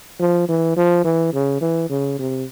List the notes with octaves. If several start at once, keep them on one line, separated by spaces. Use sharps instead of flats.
F3
E3
F3
E3
C#3
E3
C#3
C3